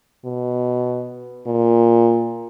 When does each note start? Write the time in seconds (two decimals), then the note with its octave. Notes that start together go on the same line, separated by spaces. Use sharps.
0.25 B2
1.47 A#2